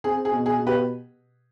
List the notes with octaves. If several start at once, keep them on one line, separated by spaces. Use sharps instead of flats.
C4 G#4
G#4
B2
G#4
B2
G4 B4